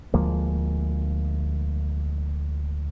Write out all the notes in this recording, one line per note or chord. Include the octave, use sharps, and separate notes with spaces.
D2 F3 G#3 A#3